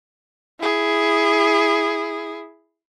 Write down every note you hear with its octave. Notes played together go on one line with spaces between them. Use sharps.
E4 G#4